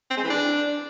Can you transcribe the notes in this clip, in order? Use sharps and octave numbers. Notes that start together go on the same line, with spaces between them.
C4
G#3
E3
D4